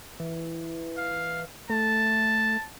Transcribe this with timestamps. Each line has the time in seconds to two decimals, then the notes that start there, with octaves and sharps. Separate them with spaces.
0.20 E3
0.97 F5
1.70 A3 A5